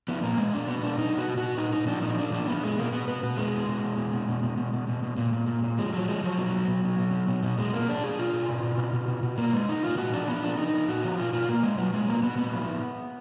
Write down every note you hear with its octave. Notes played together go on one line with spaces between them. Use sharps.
F3 B3
A#2 A#3
B2 G#3
B2 D4
B2 B3
B2 D4
B2 D#4
B2
F#4
B2
F#4
B2
A#2 D#4
A#2 D#4
F3 D4
A#2 D#4
A#2 D4
F3 D4
F3 B3
A#2 G#3
B2 A#3
B2 B3
B2 B3
B2 B3
B2 G#3
B2
B2
B2
B2
B2
B2
B2
B2
B2
B2
B2
A#2
A#2
A#2
A#2
F3 G#3
F3 F#3
F3 G#3
F3 F#3
B2
B2
B2
B2
B2
B2
B2
B2
B2 G#3
B2 A#3
B2 D4
B2 G#4
B2 F4
B2
B2
B2
B2
B2
B2
B2
B2 A#3
B2 G#3
B2 D#4
B2 F4
A#2 F#4
F3 D4
F3 B3
F3 D4
F3 D#4
F3
A#2 F#4
F3
B2 F4
B2 F4
B2 A#3
B2 G#3
B2 F#3
B2 G#3
B2 A#3
B2 B3
A#2 B3
F3